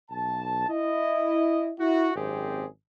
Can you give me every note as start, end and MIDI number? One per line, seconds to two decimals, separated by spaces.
0.10 0.69 35
0.10 0.69 81
0.70 1.71 64
0.70 1.71 75
1.79 2.11 64
1.79 2.11 66
2.16 2.66 32
2.16 2.66 42
2.16 2.66 60
2.16 2.66 67
2.16 2.66 68